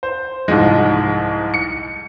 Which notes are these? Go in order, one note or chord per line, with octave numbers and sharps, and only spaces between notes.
C5
C2 G#2 F3 G#3
C#7